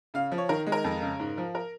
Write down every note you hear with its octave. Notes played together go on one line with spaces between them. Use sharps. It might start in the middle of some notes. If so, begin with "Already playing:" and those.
C#3 F5
F3
C#5
D#3 A#4
G#3
A#4
F2
C#3
G#2
F3
A#4